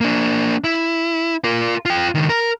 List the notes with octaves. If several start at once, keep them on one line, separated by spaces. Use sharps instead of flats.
A#3 D4
E4
F4 A#4
F4 G5
C#2 D#3
A#4